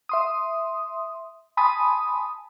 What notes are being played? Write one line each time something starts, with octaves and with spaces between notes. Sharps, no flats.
E5 C6 D#6
G#5 A5 B5 C6 D#6